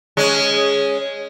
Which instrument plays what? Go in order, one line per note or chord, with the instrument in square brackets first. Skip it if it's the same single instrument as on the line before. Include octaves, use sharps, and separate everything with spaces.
[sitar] G#3 C#4